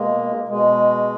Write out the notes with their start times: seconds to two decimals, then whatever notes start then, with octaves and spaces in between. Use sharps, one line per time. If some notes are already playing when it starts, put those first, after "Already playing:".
Already playing: B2 G#3 A#3
0.49 B2 G#3